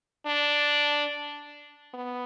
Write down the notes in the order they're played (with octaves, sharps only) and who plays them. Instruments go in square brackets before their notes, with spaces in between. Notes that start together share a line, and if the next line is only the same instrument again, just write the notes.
[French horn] D4
B3